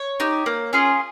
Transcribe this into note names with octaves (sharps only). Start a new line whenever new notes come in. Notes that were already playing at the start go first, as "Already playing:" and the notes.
Already playing: C#5
D#4 G4
A#3
C#4 F4 G#4